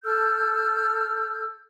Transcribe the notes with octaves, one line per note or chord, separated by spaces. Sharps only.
A4 E6 F6 G6